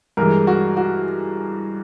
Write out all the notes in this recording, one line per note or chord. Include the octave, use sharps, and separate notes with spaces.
G2 E3 G#3 A#4
F#4
F#4